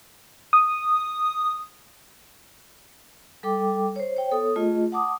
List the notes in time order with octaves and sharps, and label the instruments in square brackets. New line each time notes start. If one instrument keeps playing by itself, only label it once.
[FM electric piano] D#6
[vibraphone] G3 A4 G5 D6
C5 C#5
C5 C#5 G5
B3 A4 C#5 D#6
A3 F4 G#4 D#5
F#5 A5 D6 D#6